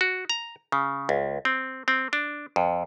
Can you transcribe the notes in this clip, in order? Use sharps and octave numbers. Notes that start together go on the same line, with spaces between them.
F#4
A#5
C#3
C#2
C4
C4
D4
F2